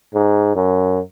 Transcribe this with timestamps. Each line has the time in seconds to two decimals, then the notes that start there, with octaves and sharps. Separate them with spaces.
0.14 G#2
0.56 F#2